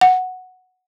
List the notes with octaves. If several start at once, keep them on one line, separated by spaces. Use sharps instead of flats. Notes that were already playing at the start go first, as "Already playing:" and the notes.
F#5